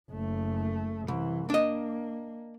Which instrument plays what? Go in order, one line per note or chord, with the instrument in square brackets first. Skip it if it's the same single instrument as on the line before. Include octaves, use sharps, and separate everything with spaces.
[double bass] F#1 A3
[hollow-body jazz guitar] C2 [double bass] E3
[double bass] A#3 [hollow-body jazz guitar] D4 D#5